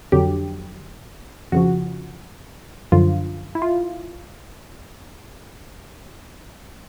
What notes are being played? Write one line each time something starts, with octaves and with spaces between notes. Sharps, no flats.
F2 D3 F#3 G4
F2 C#3 F3 F#4
F#2 D3 F3 F4
E4
F4